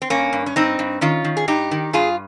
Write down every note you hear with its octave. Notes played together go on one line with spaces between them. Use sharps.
C4
G2 A#3 C#4
G2
C#4
G2 C4 D#4
G2
D#3 C#4 F4
D#3
G#4
G2 D#4 G4
D#3
G2 F4 G#4